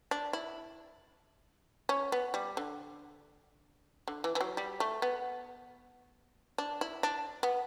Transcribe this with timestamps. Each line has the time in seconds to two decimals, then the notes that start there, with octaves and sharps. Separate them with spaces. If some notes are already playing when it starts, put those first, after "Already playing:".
0.11 D4
0.33 E4
1.89 C#4
2.12 B3
2.34 G3
2.57 D3
4.08 D3
4.24 E3
4.35 E3
4.41 F#3
4.57 G3
4.80 A3
5.02 B3
6.58 D4
6.81 E4
7.03 D4
7.43 B3